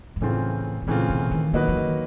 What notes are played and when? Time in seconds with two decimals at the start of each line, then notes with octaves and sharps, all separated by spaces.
0.16 G#2
0.21 A2 C#3 E3 A3 C4 F4
0.82 A2
0.87 A#2 C#3 E3 A3 C4 F4
1.10 B2
1.31 D#3
1.53 D3 F#3 A#3 D#4 F#4 B4
1.68 E3
1.76 D#3